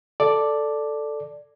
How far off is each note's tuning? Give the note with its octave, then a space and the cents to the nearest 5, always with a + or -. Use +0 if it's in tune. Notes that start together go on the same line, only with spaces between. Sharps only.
A4 +0 D5 +0